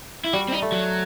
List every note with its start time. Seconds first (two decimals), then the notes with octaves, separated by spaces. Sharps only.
0.25 E4
0.33 G3 F#4
0.49 C4
0.52 D#4
0.62 A3
0.72 F#3